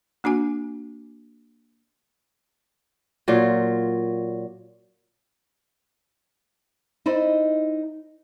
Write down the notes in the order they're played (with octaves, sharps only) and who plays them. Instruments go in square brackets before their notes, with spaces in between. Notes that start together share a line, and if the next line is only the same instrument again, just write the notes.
[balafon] A#3 D4 F#4 G#5
[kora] A#2 F#3 F4
[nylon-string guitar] D#4 E4 C5 D5 D#5